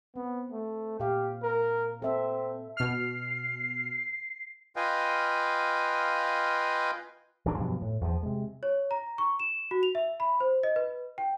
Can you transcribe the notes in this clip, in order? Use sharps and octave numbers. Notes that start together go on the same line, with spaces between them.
B3 C4
A3
A#2 G4 F5
A#4
C4 A4 E5
B2 F6 C7
F4 B4 D#5 F5 G5 G#5
A#1 E3 F#3 D4
G2 B2 F3 F#3
A2
E2 F3
C3 G#3
C#5
A#5
C#6
E7
F#4
F7
E5
B5
C5
D#5
B4
G5